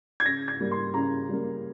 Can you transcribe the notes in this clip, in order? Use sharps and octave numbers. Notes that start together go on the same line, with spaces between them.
G#6
C#3 A#6
G#6
G3 A#3
C6
C#3 A#5
G3 A#3